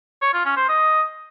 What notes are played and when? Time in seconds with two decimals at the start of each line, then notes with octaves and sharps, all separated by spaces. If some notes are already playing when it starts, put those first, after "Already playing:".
0.22 C#5
0.33 F4
0.45 C#4
0.57 C5
0.69 D#5